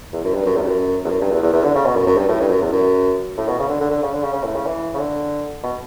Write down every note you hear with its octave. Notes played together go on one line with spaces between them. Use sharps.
E2
F#2
G2
F#2
E2
G2
F#2
E2
F#2
G2
E2
E2
E2
D3
C#3
B2
F#2
F#2
G2
A2
G2
F#2
E2
F#2
A2
B2
C#3
D3
D3
D3
C#3
D3
C#3
C#3
A2
C#3
E3
C#3
D3
B2